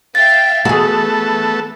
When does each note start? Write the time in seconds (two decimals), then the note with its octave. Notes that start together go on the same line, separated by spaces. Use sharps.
0.15 E5 F5 G5 A6
0.65 E3 A3 B3 F#4 G#4 A4